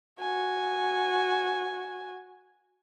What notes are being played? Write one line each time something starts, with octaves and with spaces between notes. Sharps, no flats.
F#4 G#5